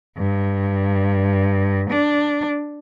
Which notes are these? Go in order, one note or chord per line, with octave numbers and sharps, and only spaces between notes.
G2
D4